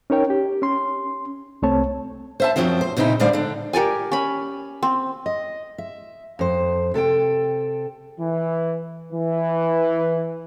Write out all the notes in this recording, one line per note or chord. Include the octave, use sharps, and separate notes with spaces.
C#4 D#4 A#4 C#5 G5
G4
C#4 C6
C2 A3 C4 C#5 A5
C5 E5 A5
F#2 A#2 F3 F#3 C4 F4
C5
A#2 C#3 C4 D#4 E4
A2 D3 G3 C5 D5 F5
D3 D4
G4 A#4 D5 G#5
C#4 B5
C4
D#5
E5
F2 C5
C3 A4 C#5 G5
E3
E3